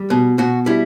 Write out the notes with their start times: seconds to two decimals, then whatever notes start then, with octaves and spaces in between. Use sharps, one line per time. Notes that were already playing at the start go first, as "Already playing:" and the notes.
Already playing: G3
0.10 B2
0.38 B2 F#4
0.66 G3 E4